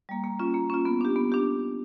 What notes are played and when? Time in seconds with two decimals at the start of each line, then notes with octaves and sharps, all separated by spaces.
0.09 G3 A#3
0.24 A#3
0.39 C#4 F4
0.54 A#3
0.70 C#4 F4
0.85 B3
1.01 D4 G4
1.16 B3
1.32 D4 G4